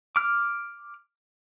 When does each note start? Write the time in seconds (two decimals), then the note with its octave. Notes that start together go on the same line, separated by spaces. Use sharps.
0.16 D6 F6